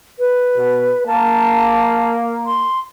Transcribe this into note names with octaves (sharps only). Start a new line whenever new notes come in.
B4
B2
A#3 A5
C6